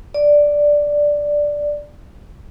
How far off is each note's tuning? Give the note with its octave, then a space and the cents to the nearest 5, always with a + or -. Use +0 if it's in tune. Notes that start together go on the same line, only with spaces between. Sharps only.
D5 +0